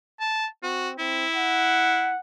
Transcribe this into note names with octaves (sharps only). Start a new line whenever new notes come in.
A5
C4 F#4
C4 E4
F#5